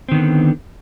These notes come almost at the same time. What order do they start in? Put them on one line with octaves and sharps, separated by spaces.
C4 D#3 B3 D3